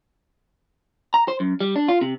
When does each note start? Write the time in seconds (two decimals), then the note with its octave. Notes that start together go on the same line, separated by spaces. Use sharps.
1.14 A#5
1.28 C5
1.40 F#2
1.60 G3
1.76 D4
1.88 F4
2.01 C3